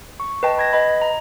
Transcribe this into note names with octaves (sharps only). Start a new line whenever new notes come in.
C#6
B4 D#5 G5 A5
B5 G#6 A#6
B4 D#5 B5
A#5